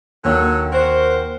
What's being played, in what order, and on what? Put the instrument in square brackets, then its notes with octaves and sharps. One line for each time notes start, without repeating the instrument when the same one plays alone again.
[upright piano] D#2 [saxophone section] D3 F#3 C#5
[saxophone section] F#4 A#4 C5